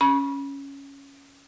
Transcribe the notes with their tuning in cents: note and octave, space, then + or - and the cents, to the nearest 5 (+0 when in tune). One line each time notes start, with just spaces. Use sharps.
C#4 +0 B5 -30